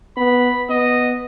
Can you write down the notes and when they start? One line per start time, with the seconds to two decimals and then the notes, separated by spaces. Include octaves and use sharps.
0.17 B3 B5
0.70 B3 D#5